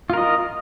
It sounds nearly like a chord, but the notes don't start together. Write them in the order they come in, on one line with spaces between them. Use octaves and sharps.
F4 A#4 D#5